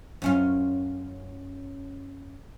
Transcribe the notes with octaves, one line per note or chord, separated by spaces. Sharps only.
F#2 C#4 F4